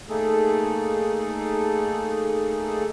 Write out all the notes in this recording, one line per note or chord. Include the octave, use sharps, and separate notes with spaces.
A3 A#3 D#4 G#4 A4